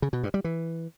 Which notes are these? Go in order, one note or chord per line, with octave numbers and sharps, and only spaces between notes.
C#3
B2
G2
G3
E3